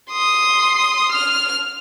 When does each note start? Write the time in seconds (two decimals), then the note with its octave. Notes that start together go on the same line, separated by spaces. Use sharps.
0.12 C6 D#6
1.12 F6